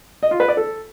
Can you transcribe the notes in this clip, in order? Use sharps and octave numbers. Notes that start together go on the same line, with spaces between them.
D#5
F4
B4
D5
A4